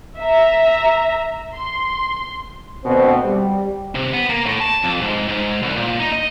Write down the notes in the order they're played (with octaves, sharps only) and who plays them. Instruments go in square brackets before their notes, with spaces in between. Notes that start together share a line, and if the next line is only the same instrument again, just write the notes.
[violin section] E5 A#5
C6
[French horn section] D2 B2 C4
G3
[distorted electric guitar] C3
B3
A#3
A2
A5
F2
G#2
G#2
C2
A#2
D#4
D#5